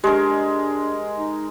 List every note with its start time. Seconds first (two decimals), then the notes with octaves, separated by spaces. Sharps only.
0.04 G#3 D4 G4 A#4
1.17 D#4